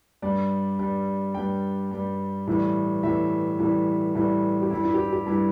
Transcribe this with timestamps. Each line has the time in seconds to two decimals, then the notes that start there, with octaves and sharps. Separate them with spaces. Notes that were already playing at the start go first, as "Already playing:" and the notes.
0.22 G2 G3 D5
0.79 G2 G3
1.34 G2 G3 G5
1.91 G2 G3
2.47 A2 E3 G3
3.03 A2 E3 G3 E5
3.59 A2 E3 G3
4.15 A2 E3 G3
4.62 G4
4.70 G2 G3 E4
4.85 E4
4.94 G4
4.99 E4
5.13 G4
5.26 G2 G3 E4